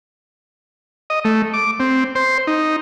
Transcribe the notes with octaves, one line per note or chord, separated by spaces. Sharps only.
D#5
A3
D6
C4
C5
D#4